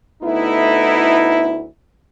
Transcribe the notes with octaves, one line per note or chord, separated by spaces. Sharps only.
D2 A3 B3 D#4 E4